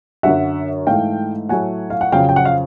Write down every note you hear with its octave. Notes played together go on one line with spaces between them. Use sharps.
F#2 D3 F#3 E5 F#5
G#2 E3 A3 F5 G5
A2 F#3 A3 F#5 G#5
F5
F#5
F2 C#3 F#3 F5 G5
G5
F#5
F5